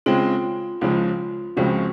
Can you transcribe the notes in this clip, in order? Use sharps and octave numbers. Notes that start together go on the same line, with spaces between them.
C#3 G#3 C4 F4
C#2 C#3 F3 G#3 F4
C#2 C#3 F3 G#3 C4 F#4